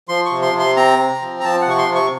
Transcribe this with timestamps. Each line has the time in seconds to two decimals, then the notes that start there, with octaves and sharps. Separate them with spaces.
0.09 F3 C6
0.25 C#6
0.31 C3
0.42 C6
0.54 C3
0.60 C6
0.77 C4 A#5
0.99 C4
1.22 F3
1.40 A#5
1.44 F3 A5
1.61 F#5
1.67 C3 C#6
1.78 C6
1.89 C3
1.95 C#6